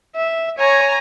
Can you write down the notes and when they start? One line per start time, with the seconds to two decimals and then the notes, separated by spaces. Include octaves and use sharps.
0.16 E5
0.58 C#5 G#5 A#5